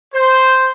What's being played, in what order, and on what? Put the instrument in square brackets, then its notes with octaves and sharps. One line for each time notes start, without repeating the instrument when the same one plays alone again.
[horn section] C5